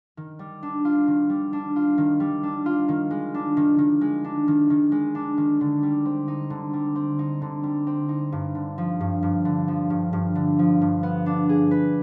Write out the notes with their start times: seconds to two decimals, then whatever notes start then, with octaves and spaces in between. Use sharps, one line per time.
0.17 D#3
0.39 G3
0.63 D4
0.85 F4
1.07 D#3
1.29 G3
1.53 D4
1.76 F4
1.98 D#3
2.20 G3
2.43 D4
2.66 F4
2.88 D#3
3.11 G#3
3.34 D4
3.57 D#3
3.78 D#3
4.01 G#3
4.24 D4
4.48 D#3
4.70 D#3
4.92 G#3
5.15 D4
5.37 D#3
5.61 D3
5.83 G3
6.06 C4
6.28 D#4
6.50 D3
6.73 G3
6.95 C4
7.19 D#4
7.42 D3
7.63 G3
7.87 C4
8.09 D#4
8.32 G2
8.55 D3
8.78 F3
9.00 G2
9.23 G2
9.45 D3
9.68 F3
9.90 G2
10.13 G2
10.35 D3
10.59 F3
10.81 G2
11.03 B3
11.26 D4
11.49 G#4
11.71 B4